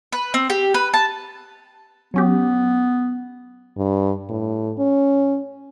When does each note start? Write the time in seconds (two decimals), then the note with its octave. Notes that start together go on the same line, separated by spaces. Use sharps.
0.12 B4
0.34 C4
0.50 G4
0.74 B4
0.94 A5
2.14 F#3 B3 C#4 G4
3.78 G2
4.30 A2
4.79 C#4